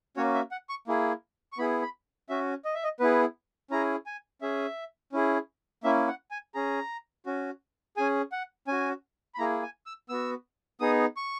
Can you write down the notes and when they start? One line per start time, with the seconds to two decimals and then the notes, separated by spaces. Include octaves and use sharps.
0.17 A#3 C#4 F#4 C#5
0.34 E5
0.51 F#5
0.69 C#6
0.87 A#3 E4 G#4
1.53 C#6
1.58 B3 E4 G#4 B5
1.82 B5
2.29 C#4 F#4 E5
2.65 D#5
2.74 E5
2.84 D#5
3.00 B3 E4 G#4 B4
3.71 C#4 E4 G#4 A#5
4.06 G#5
4.42 C#4 G#4 E5
5.12 C#4 E4 G#4
5.84 A#3 C#4 E4 E5
6.08 F#5
6.31 G#5
6.54 C#4 G#4 A#5
7.26 C#4 F#4
7.97 C#4 G#4 G#5
8.32 F#5
8.67 C#4 F#4 G#5
9.35 B5
9.38 A#3 E4 G#4 A#5
9.63 G#5
9.86 E6
10.09 B3 F#4 E6
10.80 B3 D#4 G#4 D#6
11.17 C#6